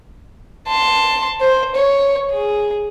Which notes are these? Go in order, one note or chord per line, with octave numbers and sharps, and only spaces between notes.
A5 C6
C5
C#5
G#4